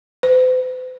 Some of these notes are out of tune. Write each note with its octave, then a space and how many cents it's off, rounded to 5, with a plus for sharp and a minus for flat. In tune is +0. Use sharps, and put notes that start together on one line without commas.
C5 -45